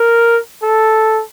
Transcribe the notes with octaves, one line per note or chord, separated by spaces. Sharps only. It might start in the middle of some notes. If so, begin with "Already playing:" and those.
Already playing: A#4
A4